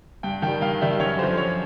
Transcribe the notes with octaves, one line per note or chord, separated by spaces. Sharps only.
G2 G5
D#3 G3 G5
G2 F5
D#3 G3 E5
F#2 C#5
D3 F3 C5
F#2 C#5